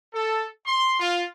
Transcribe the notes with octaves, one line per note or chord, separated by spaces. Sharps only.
A4
C6
F4